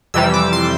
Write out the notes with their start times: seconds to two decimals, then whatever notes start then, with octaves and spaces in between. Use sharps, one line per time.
0.14 F2 C3 E3 G3 E6
0.34 D6
0.53 C6